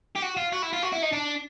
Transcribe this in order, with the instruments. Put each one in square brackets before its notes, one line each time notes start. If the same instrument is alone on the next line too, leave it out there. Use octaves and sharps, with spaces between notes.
[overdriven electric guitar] G4
F#4
F4
F#4
E4
F4
F#4
E4
D#4
D4